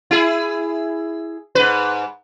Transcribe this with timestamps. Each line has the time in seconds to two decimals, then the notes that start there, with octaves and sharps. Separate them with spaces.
0.11 E4 G#4
1.55 G#2 B4